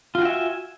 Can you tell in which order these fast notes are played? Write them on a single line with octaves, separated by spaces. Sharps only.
F4 F#4 G5 E5 G#5